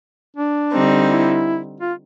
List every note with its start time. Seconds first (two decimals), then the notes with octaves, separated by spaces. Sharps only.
0.36 D4
0.72 D3 G3 C4 D#4
1.09 E4
1.80 F4